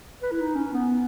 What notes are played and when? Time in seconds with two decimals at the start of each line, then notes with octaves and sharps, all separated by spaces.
0.22 B4
0.31 E4
0.40 D#4
0.56 C#4
0.73 B3